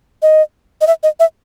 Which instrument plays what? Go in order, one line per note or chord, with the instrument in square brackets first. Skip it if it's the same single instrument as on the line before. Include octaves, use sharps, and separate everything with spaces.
[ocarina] D#5
D#5
E5
D#5
E5